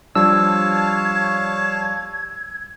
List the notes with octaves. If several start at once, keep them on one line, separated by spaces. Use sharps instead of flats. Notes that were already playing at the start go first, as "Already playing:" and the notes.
F3 G3 D4 C#5 F5 A5 E6 G#6